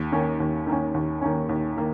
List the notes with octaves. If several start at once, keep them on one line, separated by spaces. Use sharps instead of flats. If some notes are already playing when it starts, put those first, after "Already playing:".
Already playing: D#2
D#3 A#3 C#4
D#2
D#3 A#3 C#4
D#2
D#3 A#3 C#4
D#2
D#3 A#3